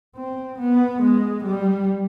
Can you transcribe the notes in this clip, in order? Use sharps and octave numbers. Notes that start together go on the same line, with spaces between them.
C4
B3
G#3
G3